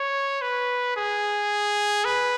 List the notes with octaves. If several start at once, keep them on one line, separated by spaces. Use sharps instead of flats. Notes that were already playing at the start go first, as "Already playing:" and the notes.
Already playing: C#5
B4
G#4
B4